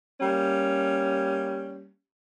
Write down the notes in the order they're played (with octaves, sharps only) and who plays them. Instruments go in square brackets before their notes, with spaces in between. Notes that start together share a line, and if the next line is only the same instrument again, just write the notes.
[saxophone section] G3 A#3 C#4